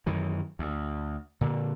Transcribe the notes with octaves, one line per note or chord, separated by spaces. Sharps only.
F#2 D#3 E3
D2
A#2 D3